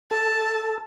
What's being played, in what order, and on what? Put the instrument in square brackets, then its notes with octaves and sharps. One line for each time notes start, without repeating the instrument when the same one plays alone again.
[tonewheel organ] A4 [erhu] A5